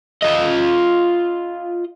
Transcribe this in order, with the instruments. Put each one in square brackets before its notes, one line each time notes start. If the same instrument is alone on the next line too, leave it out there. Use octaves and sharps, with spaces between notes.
[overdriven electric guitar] F4 D#5